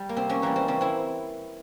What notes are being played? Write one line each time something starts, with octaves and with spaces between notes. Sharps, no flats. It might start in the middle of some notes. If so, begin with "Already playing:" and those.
Already playing: G3
A#3
C3 C4
A#3 C#4
E3 G3 A#3
C4
C#3 C4
C4 E4